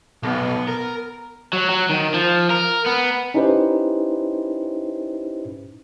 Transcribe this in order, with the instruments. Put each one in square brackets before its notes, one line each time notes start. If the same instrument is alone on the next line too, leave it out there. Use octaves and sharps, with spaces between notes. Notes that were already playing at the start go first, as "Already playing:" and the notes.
[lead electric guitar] B1 [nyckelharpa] B3
[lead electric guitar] A#4
[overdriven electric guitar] F#3
F#3
D#3
F3
A#4
B3
[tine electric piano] C#4 D#4 E4 G4 B4 C5